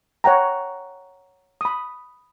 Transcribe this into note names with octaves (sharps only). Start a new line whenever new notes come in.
C#5 F#5 G5 A#5
B5 D#6